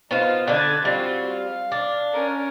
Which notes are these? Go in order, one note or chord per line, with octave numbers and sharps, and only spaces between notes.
B3 D#4 F4 C5 F5
D3 D4 B4 G#6 A6
G3 C4 F4 F#4
F5
D4
C#4 A#4